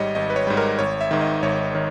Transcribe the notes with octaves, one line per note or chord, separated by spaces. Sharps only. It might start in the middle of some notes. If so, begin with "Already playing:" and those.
Already playing: G#1 G#2 G3 C#5 D#5
G#1 D#5
B4
C#5
G#2 G3
A#4
G#1 C#5
E5
G#2 D#3
D#5
G#1 C#5
D#3 C#5